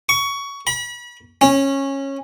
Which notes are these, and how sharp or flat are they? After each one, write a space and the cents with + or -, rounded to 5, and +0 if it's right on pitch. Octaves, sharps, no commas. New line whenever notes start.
C#6 +20
B5 -35
C#4 -15